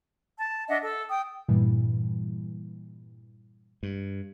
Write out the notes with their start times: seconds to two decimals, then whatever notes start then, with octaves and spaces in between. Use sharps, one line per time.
0.38 A5
0.68 D4 D#5 E5 F#5
0.82 A4
1.09 G5 D#6
1.48 G2 A#2 E3 G3
3.83 G2